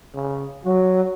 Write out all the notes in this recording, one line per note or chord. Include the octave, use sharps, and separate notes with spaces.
C#3
F#3 F#4